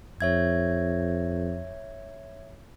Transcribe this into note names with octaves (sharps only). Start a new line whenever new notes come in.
F2 C#5 E5 G#6